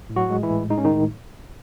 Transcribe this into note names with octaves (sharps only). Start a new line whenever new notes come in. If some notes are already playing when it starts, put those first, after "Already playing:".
A2
F#3 F#4
G#3
E3 E4
A2
G#3 D#4
C#4
D#3 D#4
A2